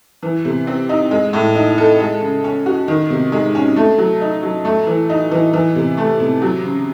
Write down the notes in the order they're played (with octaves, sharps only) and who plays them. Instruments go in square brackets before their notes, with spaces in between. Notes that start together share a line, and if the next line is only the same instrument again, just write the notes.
[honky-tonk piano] E3
C3
C4
D#4
G#3
A2
D#4
A4
G#3
C#3
C#4
F#4
D#3
C3
G#3
C#4
A3
F#3
D#4
F#3
A3
E3
D#4
E3
E3
C3
A3
C3
F#3
C#3